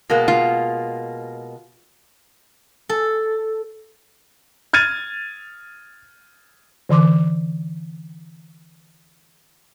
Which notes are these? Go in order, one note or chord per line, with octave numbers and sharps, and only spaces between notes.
B2 G#3 A#3
F4
A4
F6 G#6 A6 D#7
D3 E3 C6 D6